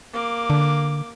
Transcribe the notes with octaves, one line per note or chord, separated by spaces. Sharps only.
A#3 D6
D3